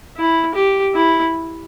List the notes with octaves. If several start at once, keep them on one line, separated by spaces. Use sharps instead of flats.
E4
G4
E4